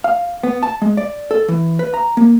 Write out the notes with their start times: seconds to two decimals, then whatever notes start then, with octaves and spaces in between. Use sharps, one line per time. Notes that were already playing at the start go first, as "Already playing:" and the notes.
0.04 F5
0.43 B3
0.63 A5
0.82 G#3
0.97 D5
1.31 A4
1.48 E3
1.79 B4
1.94 A#5
2.17 A#3